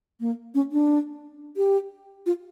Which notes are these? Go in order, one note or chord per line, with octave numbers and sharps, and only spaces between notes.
A#3
C#4
D4
G4
F4